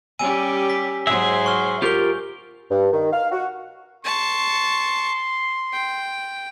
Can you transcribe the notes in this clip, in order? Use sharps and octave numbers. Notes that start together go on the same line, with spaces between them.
G3 C#4 G4 G#5 E6 D#7
B6
G#2 F#3 G#4 C5 E5 E6
C#6 F6 G7
F4 G4 A#4 G6 G7
G2
D#3
F5
F#4
A5 C6 C#6
G5